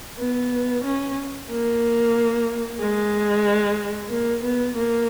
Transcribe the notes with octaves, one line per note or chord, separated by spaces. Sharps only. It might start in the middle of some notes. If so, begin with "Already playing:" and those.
B3
C#4
A#3
G#3
A#3
B3
A#3